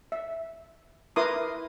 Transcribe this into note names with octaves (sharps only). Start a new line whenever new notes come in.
E5
E4 A#4 B4 C6 D6 D#6